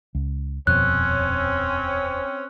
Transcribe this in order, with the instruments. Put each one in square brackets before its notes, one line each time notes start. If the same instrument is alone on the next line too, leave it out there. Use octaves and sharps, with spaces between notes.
[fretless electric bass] C#2
[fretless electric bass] D#1 F2 B2 [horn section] C4 C#4 [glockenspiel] F#6